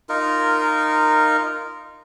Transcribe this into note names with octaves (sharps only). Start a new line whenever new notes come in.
D#4 F4 A#4